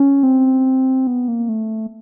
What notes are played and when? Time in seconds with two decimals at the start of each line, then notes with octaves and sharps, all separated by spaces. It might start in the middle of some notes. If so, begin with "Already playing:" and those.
Already playing: C#4
0.23 C4
1.07 B3
1.28 A#3
1.49 A3